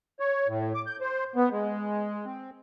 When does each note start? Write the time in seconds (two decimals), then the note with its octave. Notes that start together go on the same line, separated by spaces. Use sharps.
0.20 C#5
0.48 A2
0.74 D6
0.86 G6
1.01 C5
1.36 B3
1.52 G#3
2.25 C4